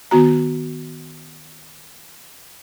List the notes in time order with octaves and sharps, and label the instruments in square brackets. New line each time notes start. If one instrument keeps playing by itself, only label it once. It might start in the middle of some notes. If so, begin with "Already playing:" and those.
[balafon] D#3 B3 F#4 A#5